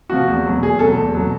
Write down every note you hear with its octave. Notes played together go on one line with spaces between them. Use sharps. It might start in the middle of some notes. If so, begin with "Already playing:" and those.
C3 F3 F#4
E2
B2 F#3
E2 G#4
B2 F#3 A4
E2
B2 F#3